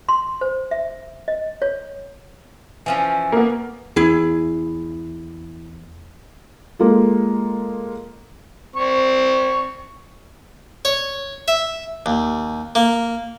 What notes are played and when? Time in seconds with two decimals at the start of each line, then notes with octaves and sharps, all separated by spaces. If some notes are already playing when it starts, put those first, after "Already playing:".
0.09 C6
0.41 C5
0.71 E5
1.28 D#5
1.62 C#5
2.86 E3 F3 C#4
3.32 A#3 B3
3.96 E2 E4 G#4
6.79 G#3 A#3 F4 A4
8.76 C4 C#6
10.85 C#5
11.48 E5
12.06 D#2
12.75 A#3